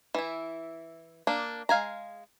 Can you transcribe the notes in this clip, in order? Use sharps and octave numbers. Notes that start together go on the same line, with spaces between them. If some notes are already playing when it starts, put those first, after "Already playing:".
E3 E4
A#3 D4
G#3 F5 G#5 A#5